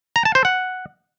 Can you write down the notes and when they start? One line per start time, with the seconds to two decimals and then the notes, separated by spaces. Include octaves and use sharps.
0.16 A#5
0.25 A5
0.35 C5
0.45 F#5